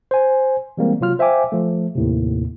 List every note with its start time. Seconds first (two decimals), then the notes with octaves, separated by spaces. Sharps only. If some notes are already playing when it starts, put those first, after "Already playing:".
0.11 C5 G#5
0.77 E3 G3 G#3 A#3 C4
1.00 C3 F#3 F4 F6
1.19 C5 E5 F5 G5 G#5 D6
1.52 F3 A3
1.95 D#2 A2 C3